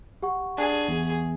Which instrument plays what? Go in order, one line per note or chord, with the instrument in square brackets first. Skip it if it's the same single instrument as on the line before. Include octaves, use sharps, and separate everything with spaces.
[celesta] G4 F#5 C#6
[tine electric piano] D4 [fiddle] G#4
[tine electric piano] E2